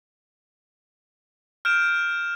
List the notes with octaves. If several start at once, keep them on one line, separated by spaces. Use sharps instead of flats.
F6 G6 D7 E7